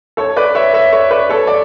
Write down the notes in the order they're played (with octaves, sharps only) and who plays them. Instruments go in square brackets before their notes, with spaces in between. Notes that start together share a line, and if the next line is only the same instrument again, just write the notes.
[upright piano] A4 C#5
B4 D5
C#5 E5
C#5 E5
C#5 E5
B4 D5
A4 C#5
D5